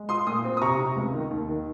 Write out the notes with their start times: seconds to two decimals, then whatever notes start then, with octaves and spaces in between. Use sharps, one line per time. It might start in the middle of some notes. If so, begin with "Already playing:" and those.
Already playing: G#3
0.09 F4 C6 D#6
0.26 A#2 C6 D#6
0.45 C4
0.57 D#6
0.61 C3 A#5 C#6
0.79 C3
0.96 C#2
1.13 D#3
1.31 D#2
1.49 D#3